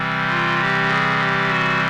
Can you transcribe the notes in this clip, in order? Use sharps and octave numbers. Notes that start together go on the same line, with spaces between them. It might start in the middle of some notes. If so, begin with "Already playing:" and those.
Already playing: C3 E3 G3 C4
F4
G4
G#4
G4
F#4